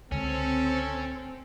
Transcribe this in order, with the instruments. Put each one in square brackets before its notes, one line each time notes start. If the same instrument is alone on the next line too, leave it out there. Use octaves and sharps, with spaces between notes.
[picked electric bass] C#2 D3 G#3 [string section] C4 [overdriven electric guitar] C#4 [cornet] A4